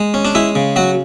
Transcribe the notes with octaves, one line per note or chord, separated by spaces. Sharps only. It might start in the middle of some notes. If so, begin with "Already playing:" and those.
Already playing: G#3
C#4
D4
G#3 E4
C#3
F#3 F#4